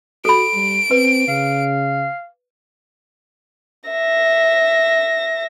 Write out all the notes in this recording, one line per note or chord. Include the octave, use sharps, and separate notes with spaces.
F#4 A4 B5 D7
G3
C4 B4
C#3 F5
E5 A#6